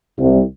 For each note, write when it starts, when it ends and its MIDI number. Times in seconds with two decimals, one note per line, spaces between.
0.19 0.41 36